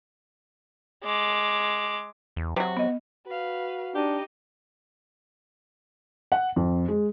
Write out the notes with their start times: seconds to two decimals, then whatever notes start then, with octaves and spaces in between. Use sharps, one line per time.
1.04 G#3 D6
2.36 E2
2.56 C3 F#3 F#4
2.77 B3 D#5
3.27 F#4 B4 F5
3.95 D4 D#4 G4 D#5
6.32 F#5
6.56 F2
6.88 G#3